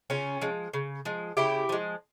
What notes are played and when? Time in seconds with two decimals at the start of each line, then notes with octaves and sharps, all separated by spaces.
0.10 C#3 C#4 F4
0.41 F3 G#3
0.74 C#3
1.05 F3 G#3
1.37 C#3 E4 G4
1.69 F3 G#3